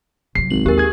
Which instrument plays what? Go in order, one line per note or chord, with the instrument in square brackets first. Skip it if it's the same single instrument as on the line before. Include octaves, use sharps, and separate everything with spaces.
[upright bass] C2 F#3 [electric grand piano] C7
[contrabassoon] G#1 [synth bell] F#7
[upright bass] D#2 [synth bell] G4 A#4
[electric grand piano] G#4 G#6